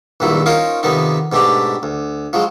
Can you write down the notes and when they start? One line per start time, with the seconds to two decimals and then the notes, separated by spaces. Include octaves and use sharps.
0.20 A#1 G2 D#3 F#3 E4
0.46 C#4 D#4 F4 A#4 C5 C#5
0.83 F2 C3 D#3 B3 D#4
1.32 G#2 B2 A3 D4 G4
1.83 D2
2.33 F3 F#3 G#3